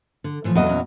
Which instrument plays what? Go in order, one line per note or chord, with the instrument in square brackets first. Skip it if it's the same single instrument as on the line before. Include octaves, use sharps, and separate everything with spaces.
[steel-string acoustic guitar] D3
A2 E3 F3
[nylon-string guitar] E2 F#3 D#5 [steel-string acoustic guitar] C#3 A#3 A4
[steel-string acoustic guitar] A#2 C#4